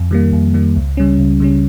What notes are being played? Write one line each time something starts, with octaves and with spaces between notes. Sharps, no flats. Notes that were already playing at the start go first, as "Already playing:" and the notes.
Already playing: F2
D#3 G3 A#3
F2
D#3 G3 A#3
C#2
C#3 G3 C#4
C#2
C#3 G3 C#4